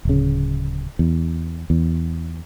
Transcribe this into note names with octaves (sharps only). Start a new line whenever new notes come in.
D1 C#3
E2
E2